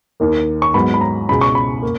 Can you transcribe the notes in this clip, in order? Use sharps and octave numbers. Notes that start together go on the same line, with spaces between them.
D#2 D#3 A#3
C#6
G#2 F#3 B3 B5
B5
A#5
C#2 B2 G#3 B5
C#6
B5
A#3